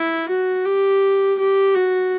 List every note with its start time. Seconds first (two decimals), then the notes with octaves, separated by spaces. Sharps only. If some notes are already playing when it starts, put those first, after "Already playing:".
Already playing: E4
0.29 F#4
0.65 G4
1.39 G4
1.75 F#4